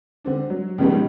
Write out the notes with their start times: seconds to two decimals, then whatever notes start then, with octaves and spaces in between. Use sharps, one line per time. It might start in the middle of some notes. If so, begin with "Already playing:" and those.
0.25 D3 C4 D4
0.50 F#3
0.78 C#2 B2 D#3 F3 G3 G#3